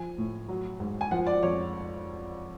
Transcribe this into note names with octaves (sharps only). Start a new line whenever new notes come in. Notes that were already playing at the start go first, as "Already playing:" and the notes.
Already playing: F3 G#5
A2
F#3
G#2
G#5
F3 F#5
D5
F2 C#5